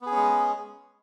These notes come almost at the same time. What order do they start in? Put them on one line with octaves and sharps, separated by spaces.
B3 G#4 C#4 G#3